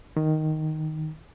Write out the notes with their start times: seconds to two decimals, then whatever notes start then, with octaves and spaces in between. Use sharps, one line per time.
0.17 D#3